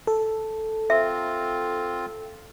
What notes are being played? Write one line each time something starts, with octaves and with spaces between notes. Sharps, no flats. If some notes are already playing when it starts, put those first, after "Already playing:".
A4
C4 F4 E5